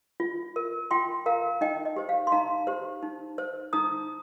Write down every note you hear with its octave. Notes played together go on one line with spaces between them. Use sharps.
F4
A#4
F4 G5 C6
A#4 F5 A#5
D#4 D#5 G5
D#5
G4 C5
F5
C6
D#4 F5 A#5
G4 C5
D#4
C5
D#4 A#5 D#6